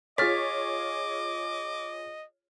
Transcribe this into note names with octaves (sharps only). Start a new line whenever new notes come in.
F4 G#4 C#5 D#5 D6 F6 A6 B6